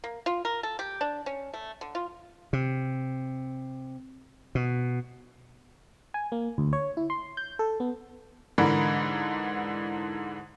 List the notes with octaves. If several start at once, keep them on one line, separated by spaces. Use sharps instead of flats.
A#3
F4
A#4
A4
G4
D4
C#4
A3
D3
F4
C3
B2
G#5
A#3
D2
C#5
E4
C6
G6
A4
B3
G#2 D3 E3 A#4 B5